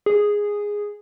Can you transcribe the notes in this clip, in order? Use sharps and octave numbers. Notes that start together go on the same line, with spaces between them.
G#4